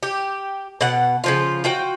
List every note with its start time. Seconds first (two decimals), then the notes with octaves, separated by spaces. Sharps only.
0.03 G4
0.81 B2 F#5
1.24 C#3 F3 F4
1.65 F4 F#4 G5